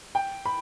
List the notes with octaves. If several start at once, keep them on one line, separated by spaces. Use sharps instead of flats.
G5
B5